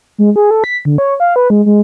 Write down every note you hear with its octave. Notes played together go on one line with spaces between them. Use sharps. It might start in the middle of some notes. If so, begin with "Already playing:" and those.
G#3
G#4
A4
B6
D3
C#5
F5
B4
G#3
G#3